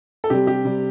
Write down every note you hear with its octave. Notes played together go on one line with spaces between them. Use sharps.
A4
C3 G3 G4
G4
C3 G3